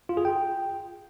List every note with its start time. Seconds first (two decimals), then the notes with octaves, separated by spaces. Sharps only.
0.09 F4
0.17 G#4
0.25 G5